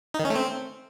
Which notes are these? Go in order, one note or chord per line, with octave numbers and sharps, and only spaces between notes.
D#4
D#3
C#4
A3
C4